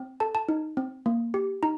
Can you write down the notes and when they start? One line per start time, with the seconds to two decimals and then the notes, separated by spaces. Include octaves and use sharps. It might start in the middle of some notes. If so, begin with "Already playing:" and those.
Already playing: C4
0.20 A4 A5
0.35 A5
0.49 D#4
0.77 C4
1.06 A#3
1.34 G4
1.63 D#4 A#5